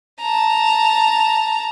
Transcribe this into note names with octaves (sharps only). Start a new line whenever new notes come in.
A5 A#5